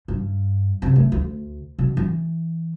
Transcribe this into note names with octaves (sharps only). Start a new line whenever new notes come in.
G2
C3 C4
A3
D2
B2
E3